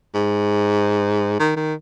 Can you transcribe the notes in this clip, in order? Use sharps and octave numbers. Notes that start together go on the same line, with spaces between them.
G#2
D#3
D#3